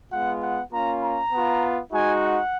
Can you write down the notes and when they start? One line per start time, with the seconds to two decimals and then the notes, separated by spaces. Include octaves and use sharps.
0.11 G#3 B3 F4 F#5
0.41 F#5
0.71 A#3 C#4 F4 A#5
1.02 A#5
1.32 B3 F4
1.92 G#3 D#4 F#4 G#5
2.22 F#5